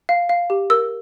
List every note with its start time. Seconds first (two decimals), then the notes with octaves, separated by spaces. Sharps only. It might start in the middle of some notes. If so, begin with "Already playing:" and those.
0.09 F5
0.29 F5
0.50 G4
0.70 A#4 E6